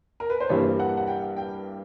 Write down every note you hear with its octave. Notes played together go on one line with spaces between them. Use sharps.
A#4
B4
C5
G2 E3 G3 A#3 C#5
F#5
F#5
G5
G5